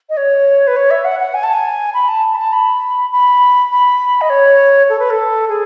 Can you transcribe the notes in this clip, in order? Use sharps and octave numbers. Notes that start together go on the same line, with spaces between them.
D#5
C#5
B4
C#5
E5
F#5
F#5
G#5
A5
G#5
B5
A5
B5
A5
B5
B5
B5
D#5
C#5
A4
B4
A4
G#4